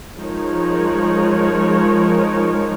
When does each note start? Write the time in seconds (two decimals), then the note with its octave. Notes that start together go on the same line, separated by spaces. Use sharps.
0.18 F3 G#3 D#4 A#4 C#5